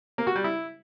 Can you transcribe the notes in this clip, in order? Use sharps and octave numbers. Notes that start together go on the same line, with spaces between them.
A#3
F#4
G3
E4